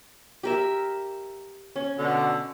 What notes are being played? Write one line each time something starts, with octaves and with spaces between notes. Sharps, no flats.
G4 A#4 E5
C#4
B2 D3